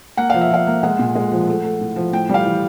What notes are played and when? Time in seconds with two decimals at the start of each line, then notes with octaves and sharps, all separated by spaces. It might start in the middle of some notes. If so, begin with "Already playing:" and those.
0.17 A#3 F#5
0.30 F3 F5
0.41 E5
0.51 F3 F5
0.67 A#3
0.83 G#3 F#5
0.99 A#2
1.15 G#3
1.32 F3
1.48 A3
1.64 A3
1.81 A2
1.96 F3
2.13 A2 G5
2.29 G3 F5
2.45 E3